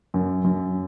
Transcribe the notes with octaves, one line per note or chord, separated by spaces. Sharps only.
F#2
F#2